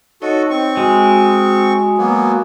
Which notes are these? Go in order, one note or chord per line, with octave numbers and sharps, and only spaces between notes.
D#4 F#4 A4 C#5 D#5
C4 C#6
G#3 F#4
F#3 A#3 B3